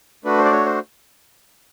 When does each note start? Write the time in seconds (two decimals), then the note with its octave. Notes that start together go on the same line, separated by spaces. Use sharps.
0.24 A3 D4 F#4 B4
0.38 C5
0.45 D5
0.52 C#5
0.65 C5